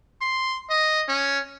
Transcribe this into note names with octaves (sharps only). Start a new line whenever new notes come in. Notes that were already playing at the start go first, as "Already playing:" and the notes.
C6
D#5
C#4